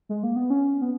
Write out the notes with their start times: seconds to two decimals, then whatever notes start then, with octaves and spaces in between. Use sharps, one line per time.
0.09 G#3
0.23 A#3
0.36 B3
0.50 C#4
0.81 B3